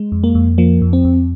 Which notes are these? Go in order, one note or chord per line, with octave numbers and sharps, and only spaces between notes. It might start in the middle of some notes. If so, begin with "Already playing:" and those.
Already playing: G#3
F2
A#3
F2
F3 A#3
F2
C4
F2